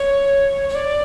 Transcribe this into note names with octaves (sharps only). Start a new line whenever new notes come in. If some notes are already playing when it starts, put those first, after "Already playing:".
Already playing: C#5
C#5
D5